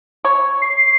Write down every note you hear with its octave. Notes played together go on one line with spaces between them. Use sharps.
C#5
C7